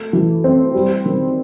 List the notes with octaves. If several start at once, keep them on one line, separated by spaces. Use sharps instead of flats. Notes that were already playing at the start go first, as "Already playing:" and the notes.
Already playing: A3
E3
C4
G3
D#3